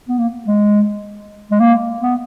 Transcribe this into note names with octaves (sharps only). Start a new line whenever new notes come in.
B3
A#3
G#3
G#3
A#3
B3